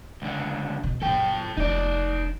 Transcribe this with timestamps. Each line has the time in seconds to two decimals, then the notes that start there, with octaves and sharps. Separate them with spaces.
0.22 C#2 D3
0.83 B2
1.02 F#1 A#2 A4 G5
1.57 F1 D#4 D5